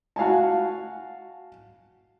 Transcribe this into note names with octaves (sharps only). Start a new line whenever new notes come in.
F#4 F5 G#5 A5